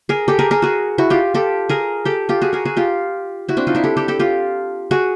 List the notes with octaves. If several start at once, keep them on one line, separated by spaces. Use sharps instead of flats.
G#4 A#4
G4 A4
G#4 A#4
G#4 A#4
F#4 G#4
E4 F#4
F4 G4
G4 A4
G#4 A#4
G4 A4
F4 G4
F#4 G#4
G#4 A#4
F#4 G#4
F4 G4
E4 F#4
C4 D4
D#4 F4
D4 E4
G4 A4
G4 A4
G4 A4
F4 G4
F#4 G#4